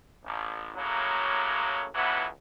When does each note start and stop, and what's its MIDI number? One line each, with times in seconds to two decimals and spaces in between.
0.24 0.69 33
0.75 1.86 33
0.75 1.86 45
0.75 1.86 49
0.75 1.86 54
0.75 1.86 58
1.95 2.25 37
1.95 2.25 45
1.95 2.25 52
1.95 2.25 54
1.95 2.25 59